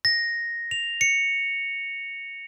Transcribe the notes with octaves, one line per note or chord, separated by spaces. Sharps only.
A#6
F7
C#7